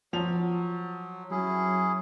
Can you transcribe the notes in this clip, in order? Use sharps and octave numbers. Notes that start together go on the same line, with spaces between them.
F3 F#3 F7
F#3 C#4 E4 G#4